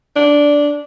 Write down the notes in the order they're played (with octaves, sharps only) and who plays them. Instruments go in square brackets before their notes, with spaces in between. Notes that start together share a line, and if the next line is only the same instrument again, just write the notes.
[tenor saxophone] D4